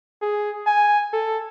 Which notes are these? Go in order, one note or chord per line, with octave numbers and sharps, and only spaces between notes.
G#4
G#5
A4